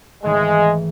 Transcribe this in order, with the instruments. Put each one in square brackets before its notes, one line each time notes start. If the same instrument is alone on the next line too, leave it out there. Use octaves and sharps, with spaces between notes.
[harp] G#1 E3 A3 [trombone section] G#3